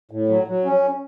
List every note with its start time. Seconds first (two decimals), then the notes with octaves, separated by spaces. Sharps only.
0.11 A2
0.29 F#3
0.47 F#3
0.65 C#4